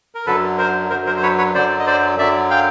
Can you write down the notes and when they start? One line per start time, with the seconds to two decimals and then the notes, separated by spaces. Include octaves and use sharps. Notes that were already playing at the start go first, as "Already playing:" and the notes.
0.15 A#4
0.26 F#2 D3 F#3 A4 B4
0.58 A#4 C5
0.90 F#2 D3 F#3 A#4 C5
1.06 A#4 C5
1.16 C5
1.23 B4 C#5
1.38 B4 C#5
1.54 F#2 D3 F#3 C5 D5
1.80 D#5
1.87 C5 D5
2.18 F#2 D3 F#3 D5 E5
2.50 F5 G5